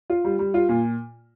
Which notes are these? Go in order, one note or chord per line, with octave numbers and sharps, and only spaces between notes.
F4
G3
G3
F4
A#2